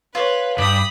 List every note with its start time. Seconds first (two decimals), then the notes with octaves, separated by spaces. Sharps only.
0.15 F4 B4 C#5
0.58 G2 G4 B5 D#6